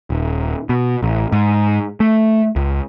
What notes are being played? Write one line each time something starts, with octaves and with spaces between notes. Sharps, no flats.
D#1
B2
A1
G#2
A3
C#2